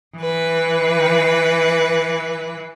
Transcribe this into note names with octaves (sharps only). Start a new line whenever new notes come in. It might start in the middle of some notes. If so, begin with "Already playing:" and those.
E3 B4